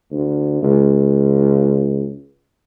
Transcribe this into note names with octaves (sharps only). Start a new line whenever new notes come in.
D2
C#2